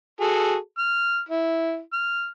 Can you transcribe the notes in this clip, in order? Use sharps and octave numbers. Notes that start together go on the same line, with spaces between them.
F#4 G#4 A4
F6
E4
F6